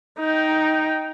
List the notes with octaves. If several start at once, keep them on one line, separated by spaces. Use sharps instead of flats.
D#4 G5